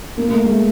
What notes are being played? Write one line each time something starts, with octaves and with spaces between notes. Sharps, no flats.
A#3
A#3
A3
G#3
A3